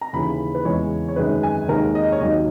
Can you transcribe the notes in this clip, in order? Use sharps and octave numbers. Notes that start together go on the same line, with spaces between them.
A#5
D#2 C#3 E3 B5
B4
E2 C#3 E3 G#3 C#5
C#5
F#2 D#3 G#3 B4
G#5
D#2 D#3 G#3 A#4
D#5
C#5
D#2 D#3 F#3 D#5